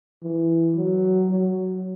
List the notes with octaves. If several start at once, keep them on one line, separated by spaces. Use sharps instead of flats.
E3
F#3
F#3